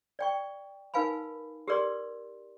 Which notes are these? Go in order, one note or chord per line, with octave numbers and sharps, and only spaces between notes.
D5 G5 C#6
D#4 A#4 B4 F5 G#5 B5
G4 G#4 A#4 B4 D5 C6